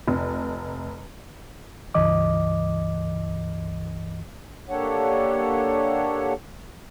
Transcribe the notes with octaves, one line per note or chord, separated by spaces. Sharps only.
F1
C#2 G2 E3 D#5 D6
A#3 D4 G4 A4 C#5 F#5